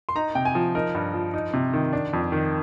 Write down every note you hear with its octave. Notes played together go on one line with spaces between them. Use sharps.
C6
D#4 A#5
C3 G5
G#5
F3
D#4 A#4
G2
F3
D#4
C3
D#3
D4
F2
D#3